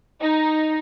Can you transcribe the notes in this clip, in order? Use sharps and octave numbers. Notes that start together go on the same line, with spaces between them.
D#4